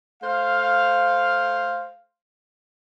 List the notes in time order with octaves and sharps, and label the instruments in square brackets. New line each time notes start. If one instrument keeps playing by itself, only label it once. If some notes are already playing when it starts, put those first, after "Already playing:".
[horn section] A3 C5 F5